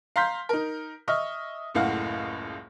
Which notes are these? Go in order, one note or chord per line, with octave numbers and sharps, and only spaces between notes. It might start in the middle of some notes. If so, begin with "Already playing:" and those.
F5 A#5 C6 G6 B6
D#4 A#4
D#5 E5 C#6 F6
F#1 C#2 A2 F5 F#5